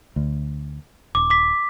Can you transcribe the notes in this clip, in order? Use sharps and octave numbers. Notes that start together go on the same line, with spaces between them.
D2
D#1 D6
D6 B6